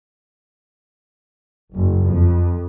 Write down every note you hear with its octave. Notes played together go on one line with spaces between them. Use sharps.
F#1
F2